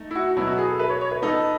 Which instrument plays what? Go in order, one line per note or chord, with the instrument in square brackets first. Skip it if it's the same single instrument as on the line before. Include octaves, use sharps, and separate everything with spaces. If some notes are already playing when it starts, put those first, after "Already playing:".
Already playing: [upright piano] A3 D#4
[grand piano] E4
F#4
[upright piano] B2 F#3 B3 [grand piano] E4
[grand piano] F#4
G#4
A4
B4
C#5
C#5
B4
[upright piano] B3 D#4 A4